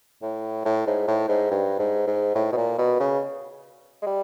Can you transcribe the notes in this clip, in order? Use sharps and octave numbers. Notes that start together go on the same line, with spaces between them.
A2
A2
G#2
A2
G#2
G2
G#2
G#2
A2
B2
A#2
B2
C#3
G#3
G3